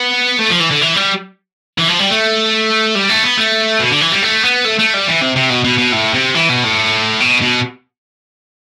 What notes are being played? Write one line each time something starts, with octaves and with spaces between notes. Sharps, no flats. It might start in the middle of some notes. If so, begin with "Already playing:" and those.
Already playing: B3
A3
F3
E3
D3
E3
G3
E3
F3
G3
A3
G3
A3
B3
A3
B2
D3
E3
G3
A3
B3
A3
A3
G3
E3
C3
C3
B2
B2
B2
A2
C3
E3
B2
A2
B2
B2